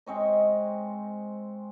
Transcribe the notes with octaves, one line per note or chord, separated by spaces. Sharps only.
G#3 C4 C#5 D#5